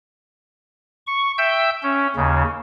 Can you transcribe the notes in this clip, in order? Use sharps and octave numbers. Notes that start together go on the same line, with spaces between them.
C#6
E5 G5 E6 G6
C#4
D#2 C#3